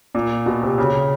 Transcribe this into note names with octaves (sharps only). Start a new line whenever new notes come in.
A#2
B2
C3
C#3